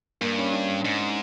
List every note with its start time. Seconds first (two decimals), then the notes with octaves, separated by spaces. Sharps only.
0.21 G2 A#3
0.38 C#4
0.52 D4
0.85 G#2